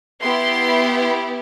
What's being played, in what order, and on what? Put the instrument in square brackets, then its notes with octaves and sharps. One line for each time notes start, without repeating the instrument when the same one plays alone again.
[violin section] B3 E4 G4 C6